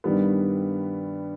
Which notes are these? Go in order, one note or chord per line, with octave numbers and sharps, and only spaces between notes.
G2 D#3 G3 B3